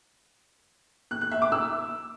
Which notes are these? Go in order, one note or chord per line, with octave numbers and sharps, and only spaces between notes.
F#6
F#6
E5
D6
E6